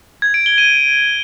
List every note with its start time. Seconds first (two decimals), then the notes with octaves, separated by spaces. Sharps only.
0.22 G#6
0.34 D7
0.46 G7
0.58 D#7